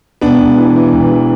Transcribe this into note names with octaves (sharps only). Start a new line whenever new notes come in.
E1 B3 D4
E1
E3
E3
E1
E3